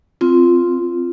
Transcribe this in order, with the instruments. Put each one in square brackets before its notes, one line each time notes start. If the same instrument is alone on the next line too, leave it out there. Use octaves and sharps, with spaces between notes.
[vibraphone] C4 F4